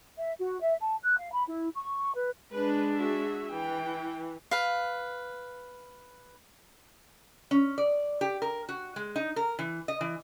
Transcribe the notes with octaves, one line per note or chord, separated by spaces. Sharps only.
E5
F#4
E5
A5
F#6
F5
B5
E4
C#6
B4
G#3 D4 B4
F#4 G#4 E5
E3 G5
B4 F5
C#4
D5
G4
A#4
F#4
G#3
D#4
A#4
E3
D#5
E3